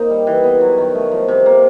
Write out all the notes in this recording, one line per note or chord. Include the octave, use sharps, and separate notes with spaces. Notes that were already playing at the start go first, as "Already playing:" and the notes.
Already playing: A#3 C4 D#4
G3
E3
B3
F#3
D#3
A3
F3
C3
A#3